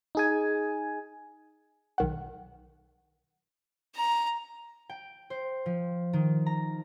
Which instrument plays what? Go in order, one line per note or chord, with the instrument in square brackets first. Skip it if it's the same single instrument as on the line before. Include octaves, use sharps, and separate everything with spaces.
[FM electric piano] D#4 G#4 G#5
[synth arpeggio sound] B1 D#3 F#5
[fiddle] A#5
[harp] G5
C5
F3
D#3
A#5